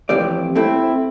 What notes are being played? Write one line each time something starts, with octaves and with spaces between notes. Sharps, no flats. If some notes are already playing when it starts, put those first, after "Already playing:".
F2 A2 E3 C4 G4 D5
A3 C4 E4